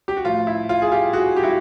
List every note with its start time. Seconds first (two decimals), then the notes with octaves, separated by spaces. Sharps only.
0.08 G4
0.16 F#4
0.25 A2 F3 F4
0.47 E4
0.69 F4
0.82 G#4
0.92 F4 G4
1.13 F#4 G#4
1.36 G4
1.43 E4 F#4